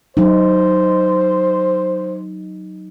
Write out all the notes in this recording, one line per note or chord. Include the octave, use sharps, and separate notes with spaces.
F#3 D#4 C5